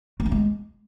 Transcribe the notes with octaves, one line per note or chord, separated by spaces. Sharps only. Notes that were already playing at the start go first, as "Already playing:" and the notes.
A3
D4
G#3